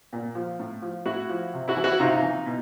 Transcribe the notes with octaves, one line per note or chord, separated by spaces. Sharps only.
A#2
F3
A2
F3
A2 E4 F#4
F3
C3
E4 F#4
E3
E4 F#4
C3 D#4 F4
E3
B2